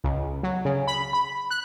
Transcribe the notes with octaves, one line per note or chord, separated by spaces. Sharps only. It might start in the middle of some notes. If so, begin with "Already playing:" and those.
C#2
F#3
C#3
B5
B5
F#6